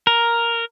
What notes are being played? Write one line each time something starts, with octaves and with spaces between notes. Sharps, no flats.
A#4